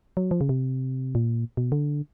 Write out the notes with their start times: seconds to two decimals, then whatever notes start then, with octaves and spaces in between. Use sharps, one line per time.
0.17 F#3
0.31 F3
0.41 C#3
0.49 C3
1.15 A#2
1.57 B2
1.72 D3